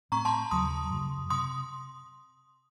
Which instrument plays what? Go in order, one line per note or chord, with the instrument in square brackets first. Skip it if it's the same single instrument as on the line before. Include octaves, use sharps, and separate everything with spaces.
[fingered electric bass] A2 A3 C4 [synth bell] A#5 C#6
[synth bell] A5 C6
[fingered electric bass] D#2 C#3 F#3 [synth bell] C6 D#6
[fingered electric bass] F#2 C#3 F#3
[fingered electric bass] C3 [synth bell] C6 D#6